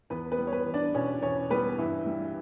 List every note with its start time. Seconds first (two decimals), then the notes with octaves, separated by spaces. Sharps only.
0.10 E2 B3 B4
0.32 B3 B4
0.39 G3
0.47 C#5
0.52 B3 B4
0.66 E2
0.74 D4 D5
0.94 B2 C#4 C#5
1.22 E2 C#4 C#5
1.50 G3 B3 B4
1.78 G2 E3 E4
2.06 G3